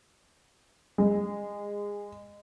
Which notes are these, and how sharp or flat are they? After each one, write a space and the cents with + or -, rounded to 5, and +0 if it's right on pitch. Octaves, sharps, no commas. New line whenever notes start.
G#3 -20